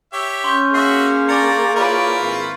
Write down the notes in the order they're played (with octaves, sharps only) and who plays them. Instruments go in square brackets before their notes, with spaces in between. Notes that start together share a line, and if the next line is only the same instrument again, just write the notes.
[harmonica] G4 C#5 E5
[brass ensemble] C#4 [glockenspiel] C6 C#6 G6
[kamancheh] A#3 G#4 [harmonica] F#4 E5 [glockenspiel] C7
[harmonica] D4 D5 A#5 [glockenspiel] C#6 A6 C#7
[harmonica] E4 A#4 B4 [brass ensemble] F4 C#5 D5
[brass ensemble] G#1 F4